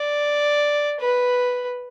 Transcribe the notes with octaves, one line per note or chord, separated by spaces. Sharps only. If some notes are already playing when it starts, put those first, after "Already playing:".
Already playing: D5
B4